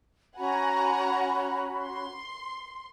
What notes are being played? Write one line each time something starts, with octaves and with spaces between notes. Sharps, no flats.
C#4 F#4 F#5 G#5 A#5 B5
C6